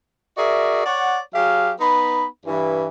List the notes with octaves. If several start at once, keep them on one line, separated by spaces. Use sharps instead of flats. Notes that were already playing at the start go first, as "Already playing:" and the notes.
F#4 G#4 A#4 D5 E5
C#5 D5 F#5
F#3 G4 G#4 F5
B3 D#4 B5
G2 E3